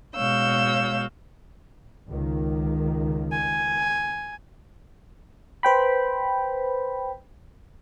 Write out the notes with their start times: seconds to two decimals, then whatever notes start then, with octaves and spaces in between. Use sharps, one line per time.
0.15 B2 G#3 C#5 F5 E6 G6
2.08 C#2 D#3
3.32 G#5
5.63 B4 C5 G5 B5